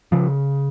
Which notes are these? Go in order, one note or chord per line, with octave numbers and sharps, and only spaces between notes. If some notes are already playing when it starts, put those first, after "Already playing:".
C#3 F3